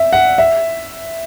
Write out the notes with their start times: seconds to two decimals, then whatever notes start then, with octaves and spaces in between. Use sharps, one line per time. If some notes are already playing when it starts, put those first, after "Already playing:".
Already playing: E5
0.13 F#5
0.38 E5